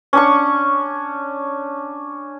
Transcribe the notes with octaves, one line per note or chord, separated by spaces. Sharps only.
C#4 D4 C#6